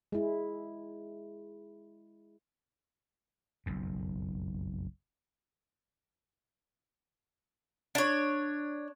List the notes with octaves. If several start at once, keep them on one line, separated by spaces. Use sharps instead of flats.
G#3 E4
F#1 B1 F2
D4 C#5